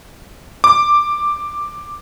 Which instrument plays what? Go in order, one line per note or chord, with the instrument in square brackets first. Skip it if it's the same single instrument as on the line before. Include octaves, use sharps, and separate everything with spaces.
[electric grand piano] D6